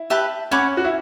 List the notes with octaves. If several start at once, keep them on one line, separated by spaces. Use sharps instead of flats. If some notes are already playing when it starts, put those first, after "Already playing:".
Already playing: E4
G4 B4 E5 A5
C#4 C#5 F#5 B5 D6
F#4
E4